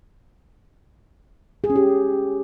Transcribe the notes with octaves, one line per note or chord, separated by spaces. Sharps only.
G#4
C#4
G4